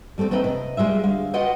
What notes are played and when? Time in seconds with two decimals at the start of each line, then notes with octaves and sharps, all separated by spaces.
0.18 G3 A3 A#3 C4
0.31 G#3 A3 C4 D#4 B4 G5
0.44 C3 D#5
0.77 G3 G#3 F4 E5
1.03 D2 G#3 F5
1.33 F4 F#4 B4 D#5 F#5 G5